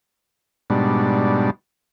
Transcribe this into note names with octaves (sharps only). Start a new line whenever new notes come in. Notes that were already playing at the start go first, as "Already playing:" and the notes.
G#2 B2 G3 D4